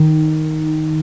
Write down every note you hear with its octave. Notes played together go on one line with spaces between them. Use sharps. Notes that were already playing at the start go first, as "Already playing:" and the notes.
Already playing: D#3